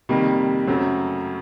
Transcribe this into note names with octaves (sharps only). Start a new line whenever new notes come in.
F2 C3 D#3 G3 A#3
F#2 C#3 F#3 A3 C4